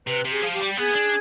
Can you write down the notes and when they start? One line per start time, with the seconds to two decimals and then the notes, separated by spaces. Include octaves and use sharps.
0.07 C3 B4
0.24 C3
0.31 G#4
0.42 F3
0.53 G4
0.60 G3
0.77 B3 G#4
0.95 D4